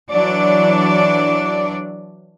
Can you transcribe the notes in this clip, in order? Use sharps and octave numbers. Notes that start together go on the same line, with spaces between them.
E3 F#3 D4 D5